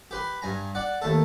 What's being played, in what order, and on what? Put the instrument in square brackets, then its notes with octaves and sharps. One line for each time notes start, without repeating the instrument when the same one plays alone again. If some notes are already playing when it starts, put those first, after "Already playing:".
[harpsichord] G4 B4 C6
G2 G#5 A#5
D5 F#5
D#2 A3 A4